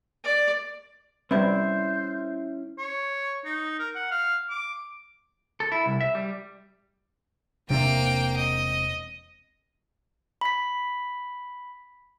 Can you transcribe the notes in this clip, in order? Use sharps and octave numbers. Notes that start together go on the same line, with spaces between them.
D5
G3 C4 C#4 E4 B4 C5 E5
C#5
D#4
A#4
F#5
F5
D6
A4
E4
C2
E5
G3
E1 C3 A#3 D4 G5
D#5
B5 B6